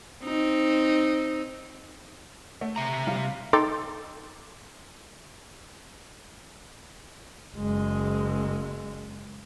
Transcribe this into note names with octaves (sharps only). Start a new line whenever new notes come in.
C4 D#4
A3
C3 E5 A#5
G3 F4
D#4 A4 G5 C6 D6 A6
F#1 G#3